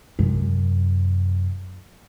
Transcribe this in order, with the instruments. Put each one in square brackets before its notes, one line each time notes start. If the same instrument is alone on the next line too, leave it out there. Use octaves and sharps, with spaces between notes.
[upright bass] F#2 C3